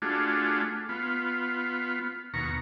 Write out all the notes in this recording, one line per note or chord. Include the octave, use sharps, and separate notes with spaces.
A3 D4 F4 F#4 G#4
B3 F4
D#2 B2 A#5 C#6